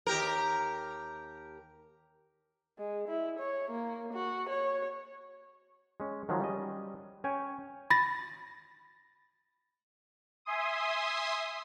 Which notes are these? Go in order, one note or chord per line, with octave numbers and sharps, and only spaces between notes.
D#2 G4 A#4
G#3
E4
C#5
A#3
F#4
C#5
G#3 C#4
D#3 F3 F#3 G#3
G3 C#4 D#5
C#4 C#5 G5 G#5
B5 A6 A#6
E5 G#5 C6 D#6